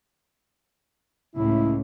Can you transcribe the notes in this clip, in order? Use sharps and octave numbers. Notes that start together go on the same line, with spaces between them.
C#2 A2 E4